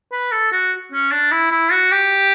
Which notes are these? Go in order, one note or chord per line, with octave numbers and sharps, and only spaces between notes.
B4
A4
F#4
C#4
D4
E4
E4
F#4
G4